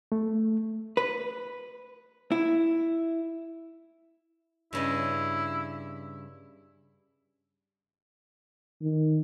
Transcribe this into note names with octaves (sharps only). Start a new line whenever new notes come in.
A3
B4
E4
G2 C#3 E4 D#5
D#3